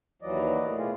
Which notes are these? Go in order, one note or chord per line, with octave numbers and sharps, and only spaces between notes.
D#2 E3 F#3 D5 D#5
A2
B2 F4 G#4